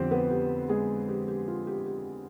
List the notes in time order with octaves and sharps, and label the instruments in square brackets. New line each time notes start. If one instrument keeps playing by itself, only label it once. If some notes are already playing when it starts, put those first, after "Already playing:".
Already playing: [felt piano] F2 D3 F3 C4 G4 C5
B3 B4
G4
G#3 G#4
G4
G4
F4
G4
G4